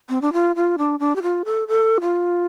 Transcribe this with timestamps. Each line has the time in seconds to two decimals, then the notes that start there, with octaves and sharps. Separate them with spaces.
0.09 C4
0.22 D4
0.33 F4
0.56 F4
0.78 D4
1.00 D4
1.16 G4
1.22 F4
1.45 A4
1.68 A4
2.01 F4